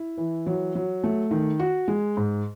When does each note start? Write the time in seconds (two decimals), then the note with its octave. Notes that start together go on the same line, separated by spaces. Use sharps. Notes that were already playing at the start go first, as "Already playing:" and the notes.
Already playing: E4
0.17 E3
0.46 F#3
0.75 F#3
1.04 A3
1.31 D#3
1.59 F#4
1.88 G#3
2.17 G#2